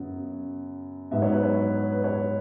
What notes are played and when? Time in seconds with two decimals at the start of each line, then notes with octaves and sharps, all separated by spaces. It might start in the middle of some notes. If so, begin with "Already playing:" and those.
Already playing: F#2 C#3 F#3 B3
1.11 G#2 F#3 B3 E5
1.22 C#5
1.33 B4
1.43 C#5
1.92 B4
2.04 C#5